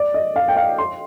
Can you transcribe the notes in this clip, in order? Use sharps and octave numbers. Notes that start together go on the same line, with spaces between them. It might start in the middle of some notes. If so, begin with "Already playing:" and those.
Already playing: D5
D#5
F5
G5
F5
C6